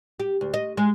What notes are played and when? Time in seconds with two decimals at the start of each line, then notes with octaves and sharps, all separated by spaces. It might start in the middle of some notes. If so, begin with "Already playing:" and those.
0.20 G4
0.41 D2
0.54 D#5
0.77 G#3